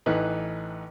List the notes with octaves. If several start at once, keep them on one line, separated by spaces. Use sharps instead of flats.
A1 E3 D#4 B4 F#6